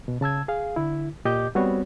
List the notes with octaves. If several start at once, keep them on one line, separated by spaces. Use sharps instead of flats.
B2
C#3 A5 E6 G#6
G#4 F5
D3 E4
A#2 G4 D#5 D6 G6
G3 B3 C4 F#4 C#5